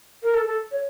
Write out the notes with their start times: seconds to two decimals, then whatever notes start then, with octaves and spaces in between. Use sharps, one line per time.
0.23 A#4
0.34 A4
0.46 A4
0.71 C#5